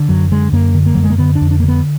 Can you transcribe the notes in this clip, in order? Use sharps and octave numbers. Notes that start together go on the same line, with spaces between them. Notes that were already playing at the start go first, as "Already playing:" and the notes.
Already playing: D3
F#2 F#3
D3 G#3
F#2 A#3
D3
A#3
F#2 F#3
G#3
A#3
D3 B3
D4
F2
D4
A#3
D3
B3